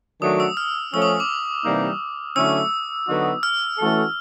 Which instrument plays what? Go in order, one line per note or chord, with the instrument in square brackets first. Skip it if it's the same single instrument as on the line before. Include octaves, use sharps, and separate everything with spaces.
[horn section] D#3 F#3 A3 D4 F#4 [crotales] D#6
[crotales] E6
F6
[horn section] F3 A3 C#4 [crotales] E6
[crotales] D#6
D6
[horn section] C3 E3 G3 A#3 D#4
[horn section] D3 F#3 A3 C#4 E4 [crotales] E6
[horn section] D3 F#3 B3 D#4 F#4
[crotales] F6
[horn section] E3 A3 C#4 F#4 A4